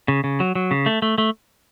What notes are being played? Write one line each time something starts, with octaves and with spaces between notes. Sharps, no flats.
C#3
C#3
F#3
F#3
C#3
A3
A3
A3